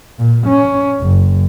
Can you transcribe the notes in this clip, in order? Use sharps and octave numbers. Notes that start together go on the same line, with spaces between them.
A#2
C#4
F#1